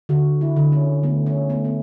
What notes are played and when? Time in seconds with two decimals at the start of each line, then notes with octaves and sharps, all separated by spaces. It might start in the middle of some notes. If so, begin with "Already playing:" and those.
0.09 D3 F#4
0.41 E4
0.56 D3
0.72 C#4
1.03 A3 B3
1.26 C#4
1.49 A3 B3
1.65 B3